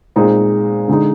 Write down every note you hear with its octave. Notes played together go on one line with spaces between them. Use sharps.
A#2 G#3 C4 D#4
D3 G#3 D#4